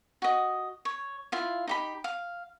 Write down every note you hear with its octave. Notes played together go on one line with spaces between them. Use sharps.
F#4 D#5
C#5
E4 F4 F5
D#4 G4 B5
F5